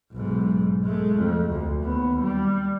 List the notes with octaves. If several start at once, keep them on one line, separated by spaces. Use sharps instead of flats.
B1 G#2
G#3 A3
F2
D2
D#2 B3
G3